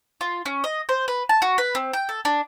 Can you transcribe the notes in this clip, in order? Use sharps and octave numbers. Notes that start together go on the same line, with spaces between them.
F4
C#4
D#5
C5
B4
A5
F#4
B4
C4
G5
A4
D4